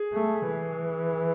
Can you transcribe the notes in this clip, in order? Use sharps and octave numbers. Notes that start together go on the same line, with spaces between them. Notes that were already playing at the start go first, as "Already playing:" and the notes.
Already playing: G#4
A3
E3